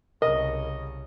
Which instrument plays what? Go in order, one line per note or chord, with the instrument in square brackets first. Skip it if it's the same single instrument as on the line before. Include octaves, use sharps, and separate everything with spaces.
[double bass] C2 C#3 [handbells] A#4 [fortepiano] D#5